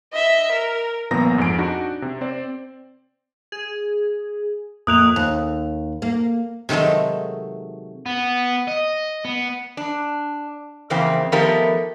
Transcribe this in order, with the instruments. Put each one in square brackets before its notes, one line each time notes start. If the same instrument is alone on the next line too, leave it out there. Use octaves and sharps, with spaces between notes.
[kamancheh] D#5 E5
A#4
[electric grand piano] G1 A#2 F3 B3 A#5 A#6
F2 G#2 G#5 D7
D4 D#4 F#4
C3
C4 C5 D5
[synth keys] G#4
[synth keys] F2 A2 A#3 [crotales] D#6 F#6 F7
[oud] D#2
A#3
[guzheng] C3 D#3 F#3 G#3 A3
[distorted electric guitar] B3
D#5
B3
[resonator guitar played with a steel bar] D4
F2 C#3 E3 A#3 C4
D#3 F3 A3 B3 G4 A#4